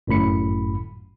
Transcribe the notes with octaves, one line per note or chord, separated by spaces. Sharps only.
G1 F#2 A2 B5 C#7